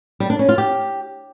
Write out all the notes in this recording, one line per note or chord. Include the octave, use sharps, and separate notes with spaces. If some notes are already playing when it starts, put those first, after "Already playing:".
G3
D4
C#4
F4
G4